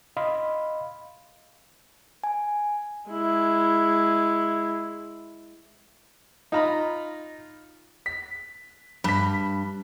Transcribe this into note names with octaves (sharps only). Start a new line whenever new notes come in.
D#5 F5 B5 C6
G#5
G#3 E4
D#4 F4 A#5 B5
B6
G2 B5 B6